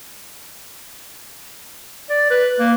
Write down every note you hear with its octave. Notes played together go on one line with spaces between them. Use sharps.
D5
B4
A#3